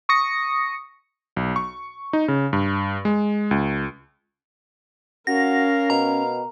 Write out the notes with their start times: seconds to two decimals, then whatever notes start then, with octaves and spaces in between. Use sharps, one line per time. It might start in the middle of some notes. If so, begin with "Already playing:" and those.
0.09 C#6 D#6 A#6 C#7
1.36 B1
1.56 C#6
2.13 D#4
2.28 C#3
2.53 G2
3.05 G#3
3.51 C#2
5.27 C#4 F#4 A#4 F5 A#6
5.90 B2 A#5